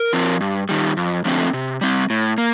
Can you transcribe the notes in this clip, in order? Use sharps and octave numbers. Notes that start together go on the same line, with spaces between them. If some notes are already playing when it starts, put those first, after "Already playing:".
Already playing: A#4
F3 C4
G2
D#3 G3
F2
D3 F3 A3 C4
C3
G3 C4
A2
A#3